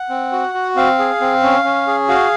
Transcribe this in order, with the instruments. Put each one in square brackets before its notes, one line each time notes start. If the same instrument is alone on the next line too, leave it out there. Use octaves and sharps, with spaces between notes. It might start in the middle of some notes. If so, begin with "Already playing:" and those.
Already playing: [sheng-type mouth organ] F#5
C4
F#4
F#4
C4 F5
G#4
C4
C#4
C#4
G#4
F#4 F5